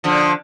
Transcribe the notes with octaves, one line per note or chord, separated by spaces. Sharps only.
D3 F3